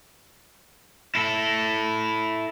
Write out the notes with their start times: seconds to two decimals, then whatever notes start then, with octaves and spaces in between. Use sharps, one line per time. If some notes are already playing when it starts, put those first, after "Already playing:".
1.15 E4 A4